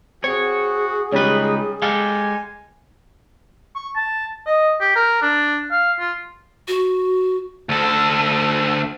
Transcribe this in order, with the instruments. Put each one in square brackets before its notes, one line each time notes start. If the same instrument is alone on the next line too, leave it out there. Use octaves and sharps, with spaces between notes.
[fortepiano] C4 [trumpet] F#4 [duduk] G#4 [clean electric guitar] C#5
[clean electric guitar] C#2 B4 [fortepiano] G3 C#4 [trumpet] D#4
[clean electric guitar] G#3 G4 A4 [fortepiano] F5 [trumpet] G#5
[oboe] C#6
A5
D#5
G4
A#4
D4
F5
F4
[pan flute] F#4
[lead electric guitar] D2 A4